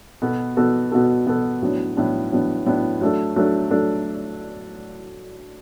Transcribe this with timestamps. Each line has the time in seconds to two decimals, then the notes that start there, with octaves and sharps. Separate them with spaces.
0.22 B2 B3 F#4 A4
0.57 B2 B3 F#4 A4
0.92 B2 B3 F#4 A4
1.26 B2 B3 F#4 A4
1.62 A2 F#3 B3 D4
1.97 A2 F#3 B3 D4
2.32 A2 F#3 B3 D4
2.66 A2 F#3 B3 D4
3.01 F#3 A3 D4 A4
3.36 F#3 A3 D4 A4
3.71 F#3 A3 D4 A4